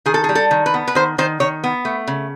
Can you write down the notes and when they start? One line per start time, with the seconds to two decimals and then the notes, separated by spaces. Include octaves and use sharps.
0.06 D#3 G#4
0.14 A4
0.24 G#4
0.29 G3
0.35 A4
0.51 D#3
0.66 B4
0.74 B3
0.87 B4
0.95 D#3 C5
1.18 D#3 C5
1.40 D#3 C#5
1.64 B3
1.85 A3
2.07 C#3